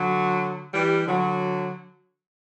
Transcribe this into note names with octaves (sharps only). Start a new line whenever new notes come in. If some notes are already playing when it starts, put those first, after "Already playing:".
Already playing: D3 F#3
E3 G3
D3 F#3